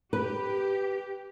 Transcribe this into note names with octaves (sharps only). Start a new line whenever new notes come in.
G4 B4